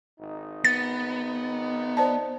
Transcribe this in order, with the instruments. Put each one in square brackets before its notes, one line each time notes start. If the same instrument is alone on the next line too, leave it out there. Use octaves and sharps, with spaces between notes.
[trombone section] G#1 D#4
[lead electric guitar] B3 [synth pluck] A6
[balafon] C5 D5 A5